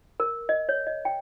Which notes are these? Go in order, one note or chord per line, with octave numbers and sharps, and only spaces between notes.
A#4
D#5
C#5
D#5
G5